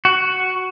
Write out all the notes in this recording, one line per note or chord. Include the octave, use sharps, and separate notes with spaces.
F#4